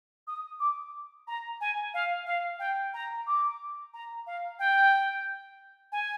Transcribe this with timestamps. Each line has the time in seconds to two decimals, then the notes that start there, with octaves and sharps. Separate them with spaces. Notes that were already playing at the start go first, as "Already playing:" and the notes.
0.27 D#6
0.60 D6
1.27 A#5
1.61 G#5
1.94 F5
2.26 F5
2.59 G5
2.94 A#5
3.27 D6
3.94 A#5
4.27 F5
4.59 G5
5.92 G#5